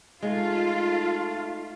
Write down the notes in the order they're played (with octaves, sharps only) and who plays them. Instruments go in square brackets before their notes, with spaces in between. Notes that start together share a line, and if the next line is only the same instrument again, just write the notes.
[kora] G#3 [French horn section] A3 D#4 [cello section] F4